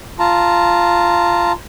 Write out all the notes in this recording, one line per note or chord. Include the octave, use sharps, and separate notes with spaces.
F4 A5 A#5